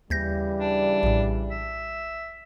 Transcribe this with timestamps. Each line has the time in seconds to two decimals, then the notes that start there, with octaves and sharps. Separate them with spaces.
0.10 D#2 C#3 E3 G3 G6 A#6
0.59 D4
1.03 A#1 A2
1.51 E5